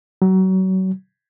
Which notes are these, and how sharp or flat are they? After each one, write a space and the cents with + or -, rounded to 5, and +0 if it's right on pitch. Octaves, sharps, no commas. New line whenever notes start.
F#3 +30